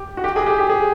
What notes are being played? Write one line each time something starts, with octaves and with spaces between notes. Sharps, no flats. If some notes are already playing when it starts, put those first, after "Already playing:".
Already playing: G4
F#4
G4
G#4
G4
G4
G#4